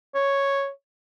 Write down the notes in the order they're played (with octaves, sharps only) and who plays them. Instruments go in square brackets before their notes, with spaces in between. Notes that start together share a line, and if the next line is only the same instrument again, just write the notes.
[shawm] C#5